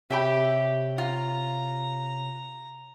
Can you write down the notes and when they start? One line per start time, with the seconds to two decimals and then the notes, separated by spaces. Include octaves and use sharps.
0.10 C3 G4 C#5 E5 G5 B5
0.98 F4 A#5